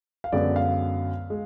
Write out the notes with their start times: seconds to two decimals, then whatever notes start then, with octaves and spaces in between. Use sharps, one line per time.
0.24 F5
0.32 F#2 D3 G#3 B3 D5
0.56 F5
1.30 G#3